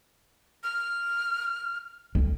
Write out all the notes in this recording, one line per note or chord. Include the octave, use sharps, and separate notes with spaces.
F6
D2